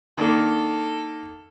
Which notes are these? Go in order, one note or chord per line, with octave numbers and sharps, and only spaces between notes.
D#3 A#3 D4 A4